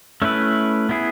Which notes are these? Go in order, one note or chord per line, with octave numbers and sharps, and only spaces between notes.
A3 C#4 E4 B4
B3 E4 G#4